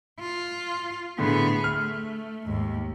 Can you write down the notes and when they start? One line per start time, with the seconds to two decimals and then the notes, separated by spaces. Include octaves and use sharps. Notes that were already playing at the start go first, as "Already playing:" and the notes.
0.20 F4
1.18 A2 D3 B3 G#4
1.64 A3 F6
2.46 D#2 G#2